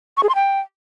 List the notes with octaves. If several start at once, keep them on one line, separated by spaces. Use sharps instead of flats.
C#6
G#4
C6
G5